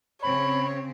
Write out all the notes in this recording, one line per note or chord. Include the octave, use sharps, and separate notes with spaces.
C#3 C4 C#5 B5